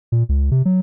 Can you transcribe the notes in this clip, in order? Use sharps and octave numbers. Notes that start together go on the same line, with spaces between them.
A#2
C#2
C3
F#3